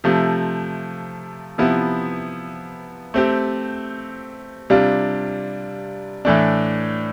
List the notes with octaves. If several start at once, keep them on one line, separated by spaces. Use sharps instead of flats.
C3 F3 A3
C3 F3 B3 E4
A3 C4 G4
C3 G3 D4 F4
A2 E3 A3 D4